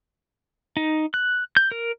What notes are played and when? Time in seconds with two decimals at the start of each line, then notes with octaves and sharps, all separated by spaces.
0.77 D#4
1.14 F#6
1.57 G6
1.72 A#4